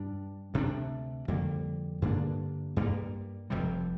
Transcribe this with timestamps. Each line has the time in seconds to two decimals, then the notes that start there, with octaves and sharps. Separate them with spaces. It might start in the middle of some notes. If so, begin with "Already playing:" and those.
Already playing: G2 G3 D4
0.54 D2 C3 A#3 D4
1.28 F2 D3 G3 A#3
2.02 G2 D3 A#3 D4
2.76 G2 G3 A#3
3.50 F1 F2 C3 G3